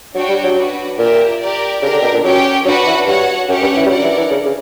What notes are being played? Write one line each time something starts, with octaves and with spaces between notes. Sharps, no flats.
F#3 D4 F#4 C#5 G5
G3
F#3
D4 F#4 B4
A#2 G4 A#4 E5
G4 A#4 D5
C#3 D4 G4 A#4
D3
B2
A#2
F#3 C#4 G4 C#5 G5
F#3 D4 F#4 B4 F#5
E3
G2 F#4 C#5 F#5
F#2 C#4 G4 C#5 F#5
G2
E3
G3
F#3 D4 A#4 D5 F#5
E3
E3
C#3
C#3